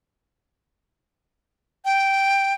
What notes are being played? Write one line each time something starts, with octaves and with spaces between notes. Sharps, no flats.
G5